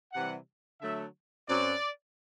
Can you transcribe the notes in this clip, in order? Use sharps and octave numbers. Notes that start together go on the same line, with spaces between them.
C3 E3 G3 F#5
D3 F#3 A3 E5
F#2 F#3 C4 D5